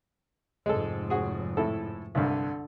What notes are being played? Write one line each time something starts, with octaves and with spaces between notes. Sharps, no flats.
F1 G#2 G#3 A4
F#4 G#4
A2 E4 A4
C2 G2 D3